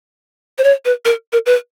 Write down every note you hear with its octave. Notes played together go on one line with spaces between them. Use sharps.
C5
C#5
B4
A#4
A#4
B4